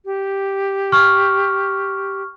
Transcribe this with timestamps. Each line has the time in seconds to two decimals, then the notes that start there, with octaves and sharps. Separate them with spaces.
0.05 G4
0.92 C#6 F6